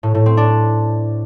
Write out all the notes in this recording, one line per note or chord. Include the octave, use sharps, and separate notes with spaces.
A2
A2
C4
D4